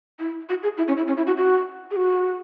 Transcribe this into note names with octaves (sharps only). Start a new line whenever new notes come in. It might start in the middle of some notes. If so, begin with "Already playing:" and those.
E4
F#4
G#4
E4
C#4
E4
C#4
E4
F#4
F#4
G#4
F#4